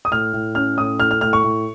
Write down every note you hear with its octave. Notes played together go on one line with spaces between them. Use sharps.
D#6
A2 F6
A2
C#4 F6
A2 D#6
A2 F6
F6
A2 F6
C#6
A2